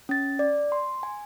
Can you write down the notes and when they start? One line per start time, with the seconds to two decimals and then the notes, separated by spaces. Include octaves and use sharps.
0.09 C#4 A6
0.39 D5
0.72 C6
1.03 G#5